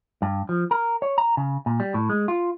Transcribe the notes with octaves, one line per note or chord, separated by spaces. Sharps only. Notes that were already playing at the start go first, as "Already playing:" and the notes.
G2
F3
A#4
C#5
A#5
C#3
A#2
G3
A2
G#3
F4